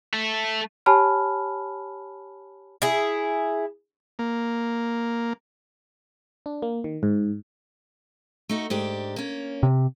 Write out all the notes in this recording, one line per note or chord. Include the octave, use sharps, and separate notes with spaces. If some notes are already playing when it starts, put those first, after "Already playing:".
A3
G4 C#5 G#5 A5 B5 F6
E4 G#4
A#3
D4
A#3
D#3
G#2
A3 D#4 F#4
G#2 D4 G4
A#3 C#4
C3